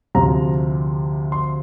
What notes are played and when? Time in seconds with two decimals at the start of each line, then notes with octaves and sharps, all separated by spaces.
0.15 D2 C3 F3 A#5
1.32 C6